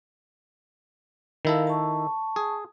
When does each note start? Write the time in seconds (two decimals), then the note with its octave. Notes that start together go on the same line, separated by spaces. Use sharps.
1.45 D#3 E4 A4 A#4 F5
1.67 A5 C#6
2.36 G#4